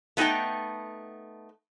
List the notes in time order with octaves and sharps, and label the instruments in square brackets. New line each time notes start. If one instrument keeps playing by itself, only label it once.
[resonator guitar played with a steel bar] A3 B3 D#4 G4 A4 G5